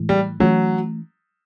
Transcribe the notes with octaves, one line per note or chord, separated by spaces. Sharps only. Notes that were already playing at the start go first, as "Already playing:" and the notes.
Already playing: A2 E3 G#3
G3
E3 F#3 A3 C#4